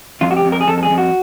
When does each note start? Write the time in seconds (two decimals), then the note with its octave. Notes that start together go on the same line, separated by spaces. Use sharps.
0.21 F2 F4
0.31 F#4
0.37 G4
0.45 F2
0.52 A#4
0.61 G#4
0.67 F2 A4
0.78 A4
0.83 G#4
0.90 F2
0.98 F#4